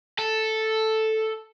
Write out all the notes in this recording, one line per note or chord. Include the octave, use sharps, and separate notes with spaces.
A4